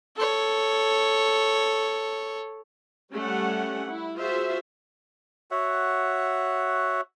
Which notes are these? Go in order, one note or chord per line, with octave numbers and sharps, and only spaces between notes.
A4 C#5
G3 A3 C#4 F#5
E4
F4 F#4 G#4 C5 E5
F#4 C#5 E5 F#5